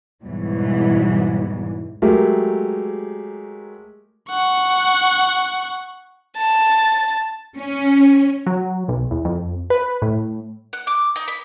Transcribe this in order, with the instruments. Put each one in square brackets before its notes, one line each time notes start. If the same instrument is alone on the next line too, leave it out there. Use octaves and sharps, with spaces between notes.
[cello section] E2 G#2 B2 E3 F#3 G3
[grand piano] F#3 G#3 A3 G4 A#4
[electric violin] F#5 C#6
[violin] A5
[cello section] C#4
[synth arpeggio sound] F#3
B1
E2
F2
B4
A2
[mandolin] F#5
D6
D#4
B5